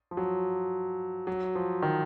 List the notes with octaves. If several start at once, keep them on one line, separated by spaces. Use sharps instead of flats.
F3
F#3
F#3
F3
D#3